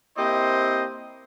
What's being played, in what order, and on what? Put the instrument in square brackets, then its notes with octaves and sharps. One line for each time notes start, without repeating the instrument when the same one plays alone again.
[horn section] A#3 C4 E4 G4 C5 D#5